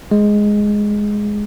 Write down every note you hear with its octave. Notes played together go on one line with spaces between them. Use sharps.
G#3